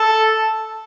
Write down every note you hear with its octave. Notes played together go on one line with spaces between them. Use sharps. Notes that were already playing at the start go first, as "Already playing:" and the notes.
Already playing: A4